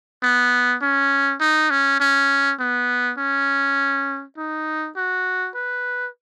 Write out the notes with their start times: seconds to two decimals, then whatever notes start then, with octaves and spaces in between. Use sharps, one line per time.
0.23 B3
0.82 C#4
1.40 D#4
1.70 C#4
2.00 C#4
2.59 B3
3.18 C#4
4.37 D#4
4.96 F#4
5.55 B4